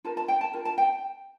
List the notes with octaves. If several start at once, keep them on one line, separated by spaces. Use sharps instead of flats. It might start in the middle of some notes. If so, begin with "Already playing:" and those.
F4 A#4 A5
A5
G5
A5
F4 A#4
A5
G5